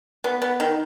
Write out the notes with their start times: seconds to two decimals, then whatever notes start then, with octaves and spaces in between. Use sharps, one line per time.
0.24 B3
0.42 B3
0.60 D#3